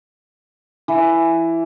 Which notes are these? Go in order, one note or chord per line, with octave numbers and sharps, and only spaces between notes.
E3